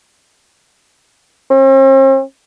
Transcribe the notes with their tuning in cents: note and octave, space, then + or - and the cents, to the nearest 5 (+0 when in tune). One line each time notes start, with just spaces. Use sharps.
C4 +45